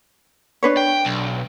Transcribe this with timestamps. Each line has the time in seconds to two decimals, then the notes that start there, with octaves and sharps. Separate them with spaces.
0.63 D4 B4 C#5
0.77 G5
1.05 B1